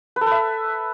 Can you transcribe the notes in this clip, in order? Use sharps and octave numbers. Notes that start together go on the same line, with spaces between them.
B4
A4
B4
E5